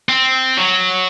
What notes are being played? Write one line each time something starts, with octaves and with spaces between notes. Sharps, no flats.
C4
F#3